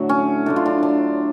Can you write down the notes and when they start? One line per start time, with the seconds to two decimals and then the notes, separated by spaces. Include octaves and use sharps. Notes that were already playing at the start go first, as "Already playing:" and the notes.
Already playing: A2 D3 F#3 A3
0.09 C#4
0.46 D3 F#3 A3 D4
0.56 F4
0.66 D4
0.83 D4